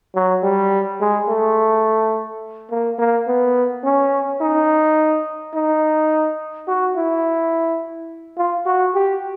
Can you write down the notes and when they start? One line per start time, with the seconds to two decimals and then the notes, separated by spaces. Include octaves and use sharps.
0.15 F#3
0.43 G3
1.01 G#3
1.28 A3
2.71 A#3
2.99 A#3
3.27 B3
3.84 C#4
4.41 D#4
5.54 D#4
6.68 F#4
6.96 E4
8.38 F4
8.66 F#4
8.95 G4